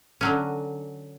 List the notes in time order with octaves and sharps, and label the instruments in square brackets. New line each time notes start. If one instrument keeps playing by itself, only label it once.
[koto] D3 F#3 C#4